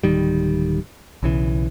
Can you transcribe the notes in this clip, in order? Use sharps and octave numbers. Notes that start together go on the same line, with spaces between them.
D1 D#3 G3
B1 C#3 E3